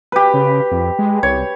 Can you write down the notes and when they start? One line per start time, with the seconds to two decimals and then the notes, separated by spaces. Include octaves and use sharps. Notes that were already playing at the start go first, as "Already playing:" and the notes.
0.12 G4 B4
0.34 C#3
0.71 F2
0.99 G#3
1.23 C2 C#5